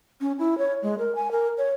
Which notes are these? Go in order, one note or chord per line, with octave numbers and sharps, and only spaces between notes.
C#4
E4
C#5
G#3
A#4
G#5
A#4
C#5